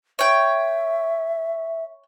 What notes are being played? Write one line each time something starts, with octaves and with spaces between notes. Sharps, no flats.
C#5 E5 G5